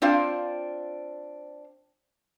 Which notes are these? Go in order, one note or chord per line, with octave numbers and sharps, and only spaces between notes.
C4 D4 F4 C5 F5